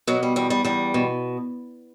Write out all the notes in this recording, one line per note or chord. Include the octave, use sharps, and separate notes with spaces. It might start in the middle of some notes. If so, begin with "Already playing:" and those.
B2 F#3
G3
E2 G3
G3
E2 G3
B2